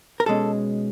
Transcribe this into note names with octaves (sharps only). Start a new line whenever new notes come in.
A#4
B2 G#3 C#4 A4